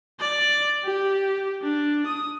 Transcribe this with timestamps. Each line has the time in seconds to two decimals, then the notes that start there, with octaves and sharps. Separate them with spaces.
0.20 D5
0.85 G4
1.62 D4
2.06 D#6